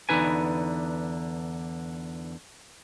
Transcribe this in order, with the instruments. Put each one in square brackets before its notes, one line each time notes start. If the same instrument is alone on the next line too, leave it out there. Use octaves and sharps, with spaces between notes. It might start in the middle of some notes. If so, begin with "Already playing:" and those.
[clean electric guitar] E2 D3 D#4 B4 G#5